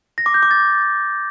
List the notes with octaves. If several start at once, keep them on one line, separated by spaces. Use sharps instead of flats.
A#6
D6
G6
D6
A6